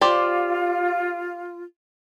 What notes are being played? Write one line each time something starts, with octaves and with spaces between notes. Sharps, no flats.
F4 G4 C5 D5